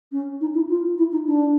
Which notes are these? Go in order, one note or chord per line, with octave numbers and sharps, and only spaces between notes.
C#4
D#4
E4
F4
E4
D#4
D4